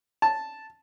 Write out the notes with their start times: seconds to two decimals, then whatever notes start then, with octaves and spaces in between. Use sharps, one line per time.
0.22 A5